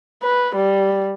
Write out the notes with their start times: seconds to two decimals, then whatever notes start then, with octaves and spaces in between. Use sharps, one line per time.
0.22 B4
0.55 G3